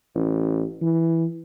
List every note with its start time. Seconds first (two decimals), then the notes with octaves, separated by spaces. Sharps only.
0.15 A1
0.81 E3